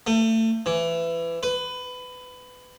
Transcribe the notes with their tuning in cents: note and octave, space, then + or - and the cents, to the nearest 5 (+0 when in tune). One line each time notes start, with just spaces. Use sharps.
A3 +30
E3 +20
B4 +20